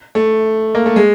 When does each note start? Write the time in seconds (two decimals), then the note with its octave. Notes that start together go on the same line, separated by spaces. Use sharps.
0.15 A3
0.75 A#3
0.86 A3
0.96 G#3